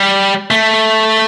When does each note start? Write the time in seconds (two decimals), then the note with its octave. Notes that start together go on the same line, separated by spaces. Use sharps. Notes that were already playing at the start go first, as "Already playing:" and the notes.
Already playing: G3
0.51 A3